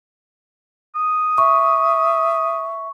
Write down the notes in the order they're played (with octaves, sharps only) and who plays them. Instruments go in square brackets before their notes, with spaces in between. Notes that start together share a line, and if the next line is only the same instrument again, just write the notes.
[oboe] D#6
[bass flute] E5 [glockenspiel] C#6